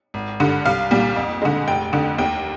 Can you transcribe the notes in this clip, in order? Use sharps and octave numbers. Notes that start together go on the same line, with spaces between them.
G#1
G2 D3
C2 F5
A#2 G3
F2
D3 G#3
F1 G5
F2 D3
D#2 G5